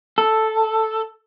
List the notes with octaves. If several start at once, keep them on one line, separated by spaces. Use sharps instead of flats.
A4